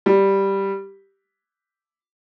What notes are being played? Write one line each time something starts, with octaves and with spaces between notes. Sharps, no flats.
G3